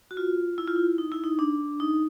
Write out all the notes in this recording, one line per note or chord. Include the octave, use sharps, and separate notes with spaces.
F#4
F4
E4
F4
E4
D#4
E4
D#4
D4
D#4